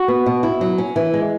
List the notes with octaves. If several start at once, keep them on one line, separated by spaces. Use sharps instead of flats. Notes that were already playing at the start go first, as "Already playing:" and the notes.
Already playing: F#4
B3
B2
E4
F#3
C#4
E3
G#3